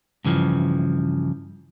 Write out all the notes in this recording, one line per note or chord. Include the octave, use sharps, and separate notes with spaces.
G2 C#3 E3 F3